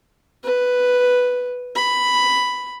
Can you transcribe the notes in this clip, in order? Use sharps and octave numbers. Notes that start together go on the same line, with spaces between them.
B4
B5